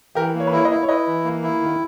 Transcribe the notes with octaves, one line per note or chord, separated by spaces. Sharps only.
E3 G4 A#4
A#3
C#5
B4
E4 A#4 C#5
B4 D#5
E4
C#5
E4 B4 D#5
E3
A#3
E4
D#3